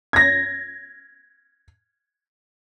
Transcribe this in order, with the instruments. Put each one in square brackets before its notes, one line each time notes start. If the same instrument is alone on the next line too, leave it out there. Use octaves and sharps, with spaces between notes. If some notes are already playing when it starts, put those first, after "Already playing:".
[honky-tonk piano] G#6 A#6